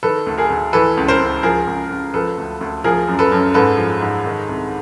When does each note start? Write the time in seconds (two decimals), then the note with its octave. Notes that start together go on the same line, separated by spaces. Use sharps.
0.03 D#3 A4 B4
0.26 D2
0.38 G#4 A#4
0.50 D2
0.73 E3 A4 B4
0.97 C#2
1.08 A#4 C5
1.20 C#2
1.43 F3 G#4 A#4
1.67 C#2
1.91 C#2
2.14 F3 A4 B4
2.38 D2
2.61 D2
2.84 F3 G#4 A#4
3.08 F#2
3.19 A4 B4
3.31 F#2
3.54 G#2 A4 B4
3.78 F3
4.01 G#2
4.25 D#3
4.48 C2